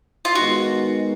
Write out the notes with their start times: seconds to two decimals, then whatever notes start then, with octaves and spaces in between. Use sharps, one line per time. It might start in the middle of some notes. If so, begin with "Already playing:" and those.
0.25 F4
0.35 D#3 G#3 B3 D#4 F#4